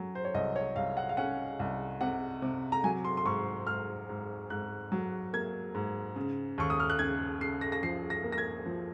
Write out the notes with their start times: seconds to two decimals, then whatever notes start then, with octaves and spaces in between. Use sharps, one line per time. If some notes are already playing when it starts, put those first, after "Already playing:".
Already playing: F#3 C#4
0.15 C5
0.25 C#5
0.34 C2 D#5
0.56 C#5
0.76 C2 F5
0.97 F#5
1.09 F5
1.17 C#4 F#5
1.59 C2
2.01 C3 F#5
2.42 C3
2.72 A#5
2.84 F#3 G#5
3.04 C6
3.17 C6
3.25 G#2 C#6
3.67 G#2 F6
4.09 G#2
4.50 G#2 F#6
4.92 F#3
5.33 A#3 G#6
5.75 G#2
6.16 C#3
6.58 D#2 C#6
6.70 D#6
6.80 F6
6.90 F#6
6.99 C#3 G#6
7.41 C#3 C7
7.61 A#6
7.72 A#6
7.83 F3 C7
8.10 A#6
8.24 A#3
8.32 A#6
8.38 G#6
8.66 F3